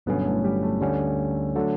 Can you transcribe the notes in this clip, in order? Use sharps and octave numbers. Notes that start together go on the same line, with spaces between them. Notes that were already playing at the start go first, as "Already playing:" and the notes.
G1 G2 B2 D3 F#3 B3 C#4
A2 A3
G3 G4
A3 A4
D2 D3 G3 C#4
D3 F#3 A3 A4